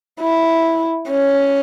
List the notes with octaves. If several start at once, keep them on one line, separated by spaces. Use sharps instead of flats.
E4
C#4